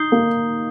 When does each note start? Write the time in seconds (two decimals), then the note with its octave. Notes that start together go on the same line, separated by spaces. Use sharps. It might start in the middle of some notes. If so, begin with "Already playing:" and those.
Already playing: D#4 D#6 G6 C7 G7
0.12 A#3